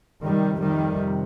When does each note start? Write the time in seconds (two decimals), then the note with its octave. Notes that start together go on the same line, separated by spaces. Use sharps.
0.23 F2 C3 D#3 G3
0.60 D#3 G3